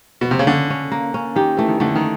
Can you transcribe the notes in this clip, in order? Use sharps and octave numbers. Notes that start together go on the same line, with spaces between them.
B2
C3
C#3
D3 C#4
C#4
A#3
C#4
D#3 G4
E3 A3
D#3
D3 A3
D#3